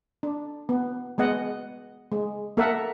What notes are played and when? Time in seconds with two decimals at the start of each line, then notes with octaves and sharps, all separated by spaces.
0.23 D4
0.69 B3
1.18 G#3 B3 D#5 F#5
2.12 G#3
2.57 A#3 A4 A#4 E5 F#5